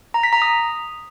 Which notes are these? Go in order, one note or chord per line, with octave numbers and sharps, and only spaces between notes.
A#5
B6
A#5
D#6